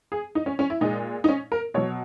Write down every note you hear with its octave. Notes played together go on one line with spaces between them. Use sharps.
G#4
D#4
C#4
C#4
E4
A#2 G#3 D#4
D#4
C#4
A#4
B2 F#3 C#5